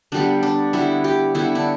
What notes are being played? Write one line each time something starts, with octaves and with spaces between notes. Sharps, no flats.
D3 G3 B3 D4
D4
D3 G3 B3 E4
G4
D3 G3 B3 E4
D4